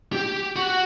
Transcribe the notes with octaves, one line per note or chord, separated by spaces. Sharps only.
G4
F#4